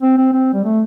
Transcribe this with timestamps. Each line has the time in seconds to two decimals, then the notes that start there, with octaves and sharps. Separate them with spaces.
0.02 C4
0.18 C4
0.33 C4
0.53 G3
0.64 A3